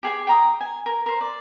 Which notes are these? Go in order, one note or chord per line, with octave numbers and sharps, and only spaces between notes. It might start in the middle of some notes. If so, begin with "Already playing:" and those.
G4 G#4 G#5
G5 A#5 D#6
G#5
A#4
A#4 C5
D5